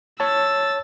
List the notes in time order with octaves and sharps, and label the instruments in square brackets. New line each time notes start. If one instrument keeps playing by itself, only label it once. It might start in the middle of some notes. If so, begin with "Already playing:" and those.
[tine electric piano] C#5 A5 [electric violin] E6 A6